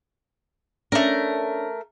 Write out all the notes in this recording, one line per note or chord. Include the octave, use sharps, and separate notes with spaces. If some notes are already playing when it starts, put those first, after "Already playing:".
A3 C#4 D4 A#4